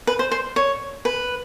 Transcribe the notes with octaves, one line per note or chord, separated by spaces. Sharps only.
B4
C5
C5
C#5
B4